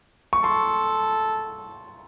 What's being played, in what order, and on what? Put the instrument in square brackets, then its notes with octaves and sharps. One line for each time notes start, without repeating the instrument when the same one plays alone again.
[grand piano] C#6
[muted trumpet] A4 [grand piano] C6